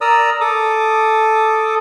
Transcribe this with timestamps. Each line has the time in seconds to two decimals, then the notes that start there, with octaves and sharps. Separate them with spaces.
0.01 A#4 D5 A#5 D#6 E6
0.41 A4 D6 D#6